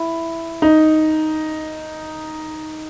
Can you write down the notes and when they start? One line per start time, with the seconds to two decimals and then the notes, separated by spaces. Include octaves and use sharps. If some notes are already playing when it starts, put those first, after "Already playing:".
Already playing: E4
0.62 D#4